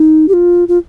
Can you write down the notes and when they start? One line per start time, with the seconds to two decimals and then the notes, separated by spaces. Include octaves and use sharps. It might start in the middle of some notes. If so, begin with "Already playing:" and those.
Already playing: D#4
0.28 G4
0.33 F4
0.68 F4